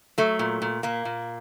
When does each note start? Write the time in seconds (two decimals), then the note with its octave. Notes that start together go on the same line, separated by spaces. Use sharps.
0.18 F#3 A3
0.39 A#2
0.62 A#2
0.83 A#2 A#3
1.05 A#2